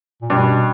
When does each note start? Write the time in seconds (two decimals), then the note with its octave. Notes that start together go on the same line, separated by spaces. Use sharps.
0.22 A#2
0.30 G2 B2